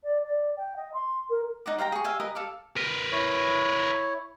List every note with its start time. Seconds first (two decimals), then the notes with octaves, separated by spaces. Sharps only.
0.03 D5
0.25 D5
0.57 G5
0.76 D#5
0.93 C6
1.29 A#4
1.66 D#4 F#5 D6
1.78 C5 F5 G5 A#5
1.92 G#4 C#6
2.04 E5 F5 G5 G#5
2.20 A#4 B4 D#5
2.35 A4 F5 D6
2.76 A#4 B4
3.12 E4 C#5